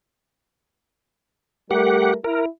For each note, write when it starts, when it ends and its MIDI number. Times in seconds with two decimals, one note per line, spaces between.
1.71 2.14 55
1.71 2.14 57
1.71 2.14 67
1.71 2.14 70
1.71 2.14 78
2.24 2.46 64
2.24 2.45 70